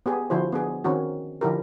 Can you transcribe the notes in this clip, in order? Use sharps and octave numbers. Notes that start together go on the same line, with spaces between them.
B3 G4 G#4
D3 F3 E4 F#4 C5
B3 D4 G#4
D#3 C4 C#4 F#4
D3 F3 D#4 E4 G4 A#4